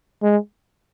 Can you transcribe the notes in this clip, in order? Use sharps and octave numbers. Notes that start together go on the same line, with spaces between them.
G#3